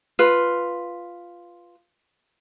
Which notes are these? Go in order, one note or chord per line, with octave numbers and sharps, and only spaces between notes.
F4 B4